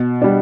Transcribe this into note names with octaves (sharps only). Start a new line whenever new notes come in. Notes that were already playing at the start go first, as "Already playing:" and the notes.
Already playing: B2
G3 D4